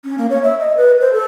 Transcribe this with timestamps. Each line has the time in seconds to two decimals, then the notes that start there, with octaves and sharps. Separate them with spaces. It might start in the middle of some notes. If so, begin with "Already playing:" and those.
0.04 C#4
0.18 A#3
0.30 C#5
0.43 E5
0.60 D#5
0.77 B4
1.01 C5
1.13 A4